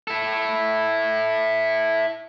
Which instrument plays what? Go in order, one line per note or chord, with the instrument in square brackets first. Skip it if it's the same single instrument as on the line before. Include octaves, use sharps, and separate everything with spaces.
[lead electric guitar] E4 A4